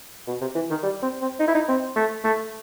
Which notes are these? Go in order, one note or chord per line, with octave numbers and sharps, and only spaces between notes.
B2
C3
E3
D#3
G3
C4
C4
D#4
E4
D#4
C4
A3
A3